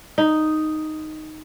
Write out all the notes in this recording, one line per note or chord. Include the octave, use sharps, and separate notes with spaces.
D#4